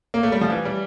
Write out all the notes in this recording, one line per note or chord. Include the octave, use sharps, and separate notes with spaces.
A#3
A3
G3
F3
E3
G3